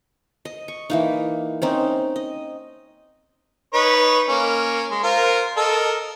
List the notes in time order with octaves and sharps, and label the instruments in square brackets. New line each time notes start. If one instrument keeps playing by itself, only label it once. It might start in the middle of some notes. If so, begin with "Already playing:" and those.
[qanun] D#5
C#6
E3 A#3 D#4
C4 C#4 D#4
D#5
[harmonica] D#4 B4 C#5
A#3 C#4
G#3
F4 A#4 C5
A4 A#4 D#5